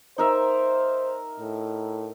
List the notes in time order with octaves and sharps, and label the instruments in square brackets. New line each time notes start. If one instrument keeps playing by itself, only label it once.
[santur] D#4 A#4 E5 [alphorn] C5
[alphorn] A2